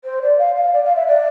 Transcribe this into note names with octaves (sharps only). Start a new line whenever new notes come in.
C5
D5
F5
F5
D5
F5
E5
D5